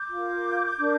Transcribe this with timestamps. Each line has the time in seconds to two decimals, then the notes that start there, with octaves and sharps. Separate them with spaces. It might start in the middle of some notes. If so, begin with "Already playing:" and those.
Already playing: D6 G6
0.10 F4 A#4
0.78 D4 A#4